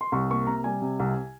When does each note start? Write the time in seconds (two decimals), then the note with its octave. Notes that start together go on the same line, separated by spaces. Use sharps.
0.01 C6
0.12 C2 C#6
0.31 A#3 C#6
0.47 C3 A#5
0.64 G3 G#5
0.82 C3
1.00 C2